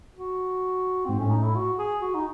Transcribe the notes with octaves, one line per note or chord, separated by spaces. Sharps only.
F#4
G#2 C4
A2 C#4
D#4
E4
F#4
G#4
F#4
D#4